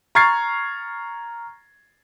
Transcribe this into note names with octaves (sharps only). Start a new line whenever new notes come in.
A#5 C#6 F6 G#6 A6 C7